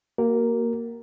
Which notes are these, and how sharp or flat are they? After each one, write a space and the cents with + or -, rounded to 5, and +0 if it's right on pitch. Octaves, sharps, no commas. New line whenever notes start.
A#3 +0 F#4 +35 A#4 +0